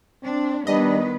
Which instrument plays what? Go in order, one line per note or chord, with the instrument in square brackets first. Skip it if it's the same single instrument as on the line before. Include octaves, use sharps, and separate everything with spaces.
[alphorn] C4 [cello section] D4
[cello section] D#3 B3 B4 [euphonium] G3 [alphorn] D4 [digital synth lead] D#5